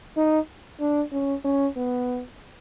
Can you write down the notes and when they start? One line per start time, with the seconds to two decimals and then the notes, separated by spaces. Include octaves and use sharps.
0.17 D#4
0.80 D4
1.12 C#4
1.45 C#4
1.76 B3